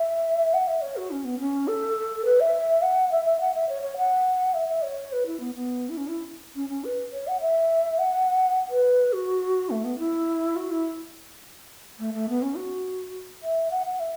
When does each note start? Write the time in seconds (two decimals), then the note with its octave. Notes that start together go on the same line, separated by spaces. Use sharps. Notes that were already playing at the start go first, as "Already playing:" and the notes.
Already playing: E5
0.54 F#5
0.68 E5
0.82 C#5
0.97 F#4
1.11 C#4
1.24 B3
1.40 C#4
1.68 A4
2.25 B4
2.40 E5
2.82 F#5
3.11 E5
3.25 E5
3.41 F#5
3.54 E5
3.69 C#5
3.82 C#5
3.97 F#5
4.54 E5
4.69 E5
4.83 C#5
5.13 B4
5.26 E4
5.40 B3
5.55 B3
5.89 E4
5.97 C#4
6.08 E4
6.55 C#4
6.69 C#4
6.84 B4
7.13 C#5
7.27 F#5
7.41 E5
7.98 F#5
8.70 B4
9.13 F#4
9.70 A3
9.84 B3
9.98 E4
10.56 F#4
10.71 E4
11.99 A3
12.14 A3
12.29 B3
12.42 C#4
12.57 F#4
13.43 E5
13.71 F#5
13.86 F#5
14.00 E5